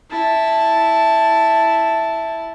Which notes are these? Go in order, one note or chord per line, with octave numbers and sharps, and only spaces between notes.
E4 A5